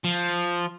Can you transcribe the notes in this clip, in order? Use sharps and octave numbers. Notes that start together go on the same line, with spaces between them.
F3